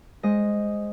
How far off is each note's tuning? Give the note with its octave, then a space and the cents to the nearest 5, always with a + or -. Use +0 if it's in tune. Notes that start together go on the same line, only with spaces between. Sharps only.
G#3 +0 C5 +0 D#5 +0